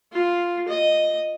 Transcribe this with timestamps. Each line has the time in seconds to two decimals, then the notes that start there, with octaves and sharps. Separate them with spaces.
0.12 F4
0.68 D#5